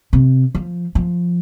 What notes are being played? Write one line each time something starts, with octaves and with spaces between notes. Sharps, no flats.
C3
F3
F3